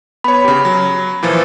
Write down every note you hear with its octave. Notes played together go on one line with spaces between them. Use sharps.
B3 C#5 B5
C#3 G4
F#3
A#2 E3 F3